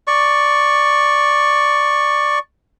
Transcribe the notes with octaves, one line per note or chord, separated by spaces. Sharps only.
D5 C#6